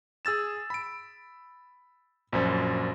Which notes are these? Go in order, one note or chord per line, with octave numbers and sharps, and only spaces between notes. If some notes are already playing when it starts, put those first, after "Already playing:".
G#4 E6 A6 E7
B5 D7
A#1 F#2 C5